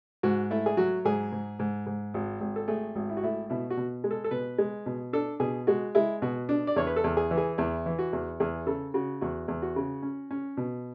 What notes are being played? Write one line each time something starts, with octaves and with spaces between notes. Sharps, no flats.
G#2 F#4
A3 E4
G#4
F#3 F#4
G#2 G#4
G#2
G#2
G#2
G#1
G#1
A4
A3 G#4
G#1
E4
F#4
A3 E4
B2 E4
F#4
B2
G#3
A4
A4
B2 B4
G#3
B2
D4 A4
B2 G#4
G#3 F#4
G#3 E4
B2 F#4
D4
D5
E2 C#5
B4
A4
E2
G#4
E3
G#4
E2 E4
E3
F#4
E2
E2 G#4
C#3 A4
C#3 F#4
E2 F#4
E2
F#4
C#3
C#4
C#4
B2